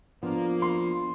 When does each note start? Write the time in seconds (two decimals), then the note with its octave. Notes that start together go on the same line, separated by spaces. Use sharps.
0.23 F3 A#3 B3 D4
0.62 C6